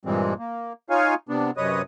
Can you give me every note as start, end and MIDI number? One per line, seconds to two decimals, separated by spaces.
0.05 0.34 43
0.05 0.34 46
0.05 0.34 52
0.05 0.34 55
0.05 0.34 56
0.05 0.34 60
0.39 0.73 58
0.90 1.14 63
0.90 1.14 65
0.90 1.14 73
0.90 1.14 77
0.90 1.14 80
1.29 1.51 48
1.29 1.51 59
1.29 1.51 62
1.57 1.82 42
1.57 1.82 48
1.57 1.82 71
1.57 1.82 73
1.57 1.82 75
1.57 1.82 87